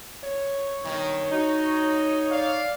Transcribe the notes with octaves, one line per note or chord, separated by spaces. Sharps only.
C#5
G2 B2 D#3
D#4 F#4
D5 F5